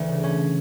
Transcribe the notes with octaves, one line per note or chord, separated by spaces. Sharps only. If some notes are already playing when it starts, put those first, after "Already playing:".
Already playing: D2 E3
C#3
B1 C#4